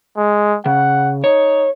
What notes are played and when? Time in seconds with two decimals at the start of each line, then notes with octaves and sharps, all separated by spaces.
0.17 G#3
0.66 C#3 F#5
1.24 D#4 C#5